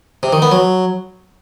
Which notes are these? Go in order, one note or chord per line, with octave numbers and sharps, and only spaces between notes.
C3
D#3
B3
F#3